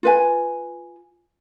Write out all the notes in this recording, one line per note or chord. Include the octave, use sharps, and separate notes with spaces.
F4 B4 G#5